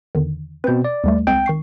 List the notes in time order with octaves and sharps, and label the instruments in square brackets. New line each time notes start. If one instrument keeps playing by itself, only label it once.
[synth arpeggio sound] E2 D3 D#3
[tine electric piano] B2 C4 [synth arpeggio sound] B4 G6
[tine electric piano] D5
[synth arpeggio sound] D#2 G3 A3
[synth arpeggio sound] C2 G#3 C4 [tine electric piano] G5
[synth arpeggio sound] D#3 C#6 C7